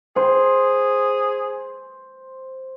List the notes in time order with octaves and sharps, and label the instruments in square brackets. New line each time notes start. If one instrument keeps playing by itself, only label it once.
[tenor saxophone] G#4 [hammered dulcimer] C5